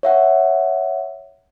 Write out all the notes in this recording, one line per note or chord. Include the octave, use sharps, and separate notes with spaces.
C#5 E5 F#5